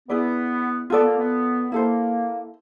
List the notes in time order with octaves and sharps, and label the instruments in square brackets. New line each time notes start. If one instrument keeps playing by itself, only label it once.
[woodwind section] B3 [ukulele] E4 G#4 B4 D5
[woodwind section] B3 [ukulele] F4 A4 D5
[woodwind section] A#3
B3
[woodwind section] A#3 [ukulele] E4 A4 C5